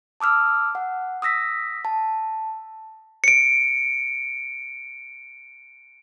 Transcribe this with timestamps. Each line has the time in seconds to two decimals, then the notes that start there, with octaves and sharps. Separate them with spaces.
0.20 A5 D6 E6 F6
0.75 F#5
1.22 D#6 E6 A#6 B6
1.85 A5
3.24 C#7 D7